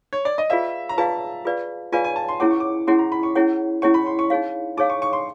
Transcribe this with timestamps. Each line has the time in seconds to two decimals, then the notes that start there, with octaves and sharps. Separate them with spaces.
0.13 C#5
0.25 D5
0.38 D#5
0.50 F4 G#4 B4 D5 E5 F5
0.89 A#5
0.98 F4 G#4 B4 D5 F5 A5
1.45 F4 G#4 B4 D5 F5
1.92 F4 G#4 B4 D5 F5 G#5
2.04 G#5
2.16 A5
2.28 C6
2.40 C#4 E4 G#4 C#5 F#5 D6
2.51 C#6
2.60 D6
2.87 C#4 E4 G#4 C#5 F#5 C6
2.99 A#5
3.12 B5
3.23 C#6
3.35 C#4 E4 G#4 C#5 F#5
3.82 C#4 E4 G#4 C#5 F#5 C#6
3.94 B5
4.06 C6
4.19 C#6
4.30 D#4 G#4 C#5 F5
4.77 D#4 G#4 C#5 F5 D6
4.90 C#6
5.02 C#6
5.13 C6